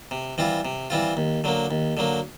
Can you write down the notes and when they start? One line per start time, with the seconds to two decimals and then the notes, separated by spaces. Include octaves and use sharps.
0.11 C3
0.38 E3 G3 C4 F4
0.65 C3
0.90 E3 G3 C4 F4
1.17 D#2
1.44 D3 F#3 A#3
1.71 D#2
1.97 D3 F#3 A#3